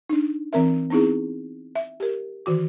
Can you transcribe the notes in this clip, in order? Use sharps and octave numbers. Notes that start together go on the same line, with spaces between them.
D4 D#4
E3 C4 A#4 E5
B3 C4 D#4 E4 G#4
E5
G4 A#4
D#3 E3 F#4 D6